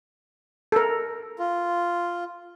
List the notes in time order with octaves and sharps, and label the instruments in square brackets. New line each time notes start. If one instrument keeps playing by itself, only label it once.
[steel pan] A4 A#4
[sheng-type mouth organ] F4